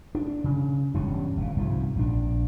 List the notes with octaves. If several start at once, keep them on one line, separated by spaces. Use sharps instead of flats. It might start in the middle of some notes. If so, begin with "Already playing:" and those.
D4
C#3
E1 G2 G3 C#4
G1 A#2
C2 G#2 F3
A#1 D4